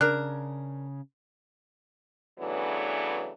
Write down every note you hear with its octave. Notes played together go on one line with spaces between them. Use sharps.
C#3 D4 A#4 F#6
C#3 E3 F#3 A3 B3 D4